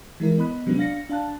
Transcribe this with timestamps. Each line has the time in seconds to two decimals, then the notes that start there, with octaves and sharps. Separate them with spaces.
0.20 E3 G#3 E4 A#4
0.38 B3 D#5 B5 F#6
0.66 C3 F#3 G#3 B3 C#4 D4
0.78 D4 F5 A#6 C#7
1.09 D4 F5 A5 F#6